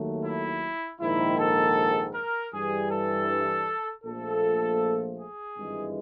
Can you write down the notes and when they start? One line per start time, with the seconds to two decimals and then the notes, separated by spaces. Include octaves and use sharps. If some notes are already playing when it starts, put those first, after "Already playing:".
Already playing: D#2 D#3 F#3 A3
0.25 E4
1.01 A#1 G#2 D#3 E4
1.38 A4
2.15 A#4
2.53 G2 E3 G3 G#4
2.91 A4
4.04 A#1 A#2 F3 A3 A4
5.18 G#4
5.56 G#1 G2 E3 G#3